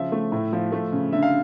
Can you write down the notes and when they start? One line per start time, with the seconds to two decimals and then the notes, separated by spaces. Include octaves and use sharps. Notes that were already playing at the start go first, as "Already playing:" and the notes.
Already playing: C#3 F3 E5
0.12 A3
0.32 A2
0.53 F3
0.72 A3
0.92 C#3
1.12 D3 E5
1.22 F5